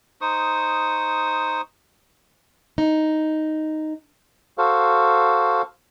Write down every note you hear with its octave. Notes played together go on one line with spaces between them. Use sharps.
D#4 C5 C#6 D#6
D#4
F#4 A4 C5 F5